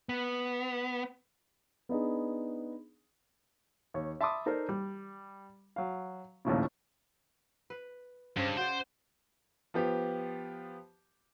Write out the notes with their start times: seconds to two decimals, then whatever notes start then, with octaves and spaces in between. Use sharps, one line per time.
0.09 B3
1.89 B3 D4 D#4 G#4
3.94 D#2 C#5
4.21 E5 A5 B5 C6 D6 D#6
4.46 D#4 A4 A#4 C5 D5
4.69 G3
5.76 F#3 F5
6.45 A#1 D#2 A2 C#3
7.70 B4
8.36 G2 C#3 C5 C#5
8.57 F#4 C5 D5
9.74 F3 B3 G4